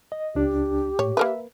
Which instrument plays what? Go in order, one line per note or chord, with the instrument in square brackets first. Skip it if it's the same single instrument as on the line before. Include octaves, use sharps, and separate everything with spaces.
[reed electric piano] D#5
[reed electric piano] C#2 D4 [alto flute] G4
[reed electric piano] A2 [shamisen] C#5
[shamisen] A#3 A#4 B4 [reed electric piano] E5